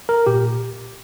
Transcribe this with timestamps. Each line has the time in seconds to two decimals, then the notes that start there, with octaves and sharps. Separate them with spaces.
0.09 A#4
0.26 A#2 G4